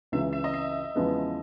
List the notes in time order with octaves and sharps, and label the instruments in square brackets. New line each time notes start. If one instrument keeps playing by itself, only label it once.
[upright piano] C#2 C#3 E3 [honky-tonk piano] E5
[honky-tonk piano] E5
D#5
E5
[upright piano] E2 C#3 F3 G#3 B3